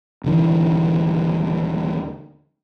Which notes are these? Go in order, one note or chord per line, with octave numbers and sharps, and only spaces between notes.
D#1 D3 E3